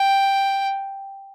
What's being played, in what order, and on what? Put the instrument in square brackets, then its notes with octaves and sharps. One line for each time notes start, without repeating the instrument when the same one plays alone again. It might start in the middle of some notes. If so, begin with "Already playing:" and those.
Already playing: [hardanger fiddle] G5